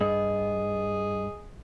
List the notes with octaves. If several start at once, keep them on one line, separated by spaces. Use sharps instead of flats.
G2 G#4 D#5